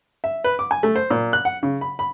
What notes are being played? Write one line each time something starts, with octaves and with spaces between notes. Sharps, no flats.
E5
B4
D6
G#5
A3
C5
A#2
F#6
F#5
C#3
B5
B5